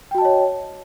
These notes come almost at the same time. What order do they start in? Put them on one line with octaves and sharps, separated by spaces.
G5 F#4 A5 D#5 C#5